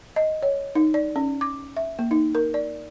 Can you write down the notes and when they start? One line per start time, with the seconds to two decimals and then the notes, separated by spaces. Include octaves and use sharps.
0.16 D#5
0.43 C#5
0.75 D#4
0.94 D5
1.16 C#4
1.41 D6
1.77 E5
1.99 A#3
2.11 D#4
2.35 A#4
2.54 D5